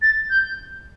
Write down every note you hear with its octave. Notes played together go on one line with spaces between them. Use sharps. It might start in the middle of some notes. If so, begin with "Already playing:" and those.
A6
G6